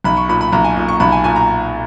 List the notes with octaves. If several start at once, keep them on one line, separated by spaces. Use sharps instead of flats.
B1 B5
C#6
A#2 B5
B5
B1 A#5
G#5
A#2
C#6
B1 B5
G#5
A#2 G#5
A#5